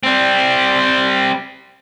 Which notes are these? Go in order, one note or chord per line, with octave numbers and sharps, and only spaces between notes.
G3 C4